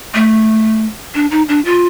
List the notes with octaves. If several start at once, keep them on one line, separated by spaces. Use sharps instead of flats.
A3
D4
D#4
D4
F4